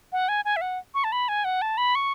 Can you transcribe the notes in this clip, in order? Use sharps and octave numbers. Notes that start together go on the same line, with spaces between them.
F#5
G#5
G#5
E5
F#5
C#6
A5
B5
G#5
F#5
A5
B5
C#6